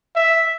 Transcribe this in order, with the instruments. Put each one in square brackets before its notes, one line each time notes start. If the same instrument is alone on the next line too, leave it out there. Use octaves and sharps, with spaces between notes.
[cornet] E5